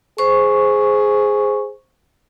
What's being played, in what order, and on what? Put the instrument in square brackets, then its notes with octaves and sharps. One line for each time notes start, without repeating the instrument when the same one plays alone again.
[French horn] G#4 [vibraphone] C5 C#6